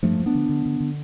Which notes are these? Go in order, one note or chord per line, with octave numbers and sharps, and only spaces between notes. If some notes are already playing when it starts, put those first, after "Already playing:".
G2 F3 A3
G2
B3 D4
D3
D3
D3
D3